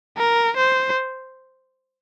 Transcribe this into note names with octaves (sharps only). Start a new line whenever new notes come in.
A#4
C5